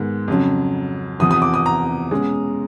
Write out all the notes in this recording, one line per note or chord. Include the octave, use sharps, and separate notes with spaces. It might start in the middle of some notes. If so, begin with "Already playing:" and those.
Already playing: G#2 D#3 G#3 B3
F2 C#3 F#3
E2 C3 F3 D#6
D#6
D6
D#6
A#5
B2 G#3 C#4